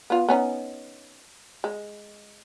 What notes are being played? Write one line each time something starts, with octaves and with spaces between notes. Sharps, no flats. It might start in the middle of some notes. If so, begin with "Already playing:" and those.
B3 F4
B3 C#4 D#4
G#3